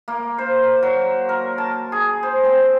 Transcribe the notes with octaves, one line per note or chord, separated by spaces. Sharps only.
A#3
C5
F#3
A#4
A5
G#4
C5
C4